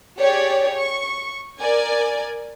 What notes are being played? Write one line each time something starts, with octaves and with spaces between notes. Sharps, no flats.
G4 G#4 C#5 D5
C#6
A#4 D5 G#5